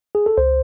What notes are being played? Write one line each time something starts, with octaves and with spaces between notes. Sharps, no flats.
G#4
A4
C#2 C5